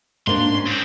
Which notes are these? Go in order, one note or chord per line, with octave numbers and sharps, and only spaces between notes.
G#2 A#3 D4 C6
C#4
G#2 C4